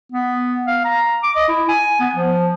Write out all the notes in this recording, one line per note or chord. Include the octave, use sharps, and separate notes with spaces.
B3
F5
A#5
D6
D#5
E4
G#5
B3
F3